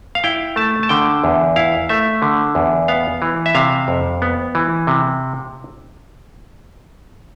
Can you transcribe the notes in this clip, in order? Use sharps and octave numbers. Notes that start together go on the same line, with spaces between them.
F5
E4 G5
A3 A5
A5
D3 G5
E2
E4 F5
A3 E5
D3
E2
B3 F5
E3
E5
C3 F5
F2
B3
E3
C3